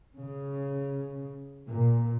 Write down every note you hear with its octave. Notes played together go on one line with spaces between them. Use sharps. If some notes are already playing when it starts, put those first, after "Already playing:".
C#3
A#2